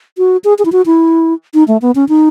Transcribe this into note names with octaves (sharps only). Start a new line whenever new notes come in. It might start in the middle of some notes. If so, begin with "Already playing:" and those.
F#4
G#4
G#4
E4
F#4
E4
D#4
A3
B3
C#4
D#4